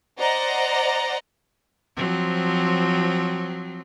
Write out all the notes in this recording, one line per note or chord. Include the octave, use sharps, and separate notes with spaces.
C5 D5 D#5 F#5 A#5
F3 F#3 C4